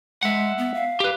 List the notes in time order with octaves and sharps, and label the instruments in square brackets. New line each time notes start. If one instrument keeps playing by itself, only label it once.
[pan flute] G#3 [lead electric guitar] E5 F#5
[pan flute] B3
F5
[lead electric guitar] G4 B4